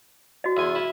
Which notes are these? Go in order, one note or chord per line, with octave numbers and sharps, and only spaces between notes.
F#4 D#5
E2 G#5 C6
E4